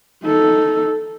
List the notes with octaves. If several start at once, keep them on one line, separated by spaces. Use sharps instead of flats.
D#4 A4